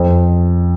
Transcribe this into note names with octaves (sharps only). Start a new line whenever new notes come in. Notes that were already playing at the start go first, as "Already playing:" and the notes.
Already playing: F2